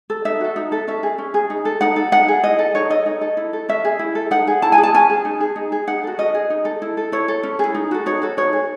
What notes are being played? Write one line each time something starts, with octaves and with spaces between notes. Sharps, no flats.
A4
D#4 E5
F#4 A4
D#4
A4
C#4 E5
G#4
C#4
G#4
D#4
A4
D#4 F#5
A4
D#4 F#5
G#4
E4 D#5
A4
D#4 C#5
A4 D#5
D#4
A4
E4
A4
C#4 E5
G#4
E4
A4
D#4 F#5
G#4
E4 A5
G#5
G#4
A5
C#4 G#5
G#4
D#4
G#4
D#4
G#4
D#4 F#5
F#4 A4
C#4 D#5
G#4
D#4
A4
E4
A4
E4 C#5
A4
C#4
E4 G#4
D#4
F#4 A4
D#4 C#5
F#4 A4
D#4 C#5
G#4